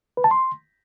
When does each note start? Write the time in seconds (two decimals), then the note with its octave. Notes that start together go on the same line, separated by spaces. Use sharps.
0.17 B4
0.24 A5
0.31 C6